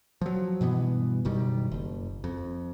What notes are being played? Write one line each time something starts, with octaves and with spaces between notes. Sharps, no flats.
F3 F#3
G2 B2 E3 B3
F#1 B2 D#3 G3
F#1
F2